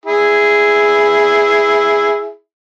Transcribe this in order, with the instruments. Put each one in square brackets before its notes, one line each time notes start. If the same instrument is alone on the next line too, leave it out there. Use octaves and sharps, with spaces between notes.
[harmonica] E4 G#4